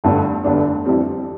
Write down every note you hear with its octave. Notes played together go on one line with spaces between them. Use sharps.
G1 G2 D3 A3 D4
G1 G2 D3 A3 D4
F2 E3 G3 C4